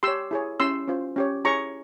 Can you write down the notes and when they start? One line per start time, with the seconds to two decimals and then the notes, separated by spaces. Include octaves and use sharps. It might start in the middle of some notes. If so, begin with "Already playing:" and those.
0.03 G4 C#5 C6 E6
0.31 E4 G#4 C#5
0.60 C#4 E4 G4 C6 E6
0.88 C#4 F4 C5
1.16 C#4 G4 C#5
1.44 E4 G#4 C#5 A#5 C#6